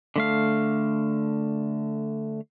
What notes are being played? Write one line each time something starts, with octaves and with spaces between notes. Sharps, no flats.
D3 A3 F5